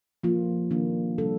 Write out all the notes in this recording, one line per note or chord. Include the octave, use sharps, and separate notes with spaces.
F3 A#3 F4
D#3 A#3 D4
C3 G3 D4 A4